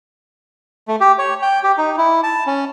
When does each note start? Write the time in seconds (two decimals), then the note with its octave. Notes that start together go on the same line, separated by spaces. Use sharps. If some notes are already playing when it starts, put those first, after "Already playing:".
0.88 A3
1.01 G4
1.19 C#5
1.42 G5
1.63 G4
1.78 D#4
1.98 E4
2.23 A5
2.47 C#4